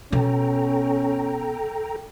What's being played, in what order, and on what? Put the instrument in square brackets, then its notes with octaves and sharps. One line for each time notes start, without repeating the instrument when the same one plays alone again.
[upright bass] B2 [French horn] C#4 [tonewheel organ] A4 G5 A#5